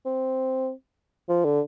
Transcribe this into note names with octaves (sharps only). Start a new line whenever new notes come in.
C4
F3
D3